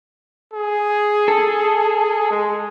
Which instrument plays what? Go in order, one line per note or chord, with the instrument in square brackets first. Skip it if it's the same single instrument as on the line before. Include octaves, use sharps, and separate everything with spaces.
[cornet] G#4
[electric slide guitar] A4
[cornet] G#3